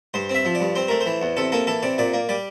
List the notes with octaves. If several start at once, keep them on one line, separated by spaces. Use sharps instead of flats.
G2 C5
C4
E5
F3
D5
G2
C4 C5
A3 A#4
C5
E3
E2
C3 A4
A#3 A4
E3 A4
C3 D5
A#2 D5
A#3
G3 D5